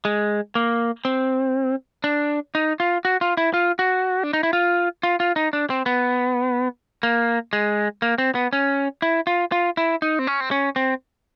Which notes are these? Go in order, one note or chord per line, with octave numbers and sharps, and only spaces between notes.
G#3
A#3
C4
D4
D#4
F4
F#4
F4
E4
F4
F#4
D4
D#4
E4
F4
F4
F4
D#4
D4
C4
B3
A#3
G#3
A#3
C4
B3
C#4
E4
F4
F4
E4
D#4
C4
C#4
C4
C#4
C4